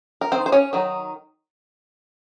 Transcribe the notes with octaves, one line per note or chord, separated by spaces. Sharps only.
A#4
D#3 F#3 C4 C5
C5
C#4 C#5
D#3 F#3 D#4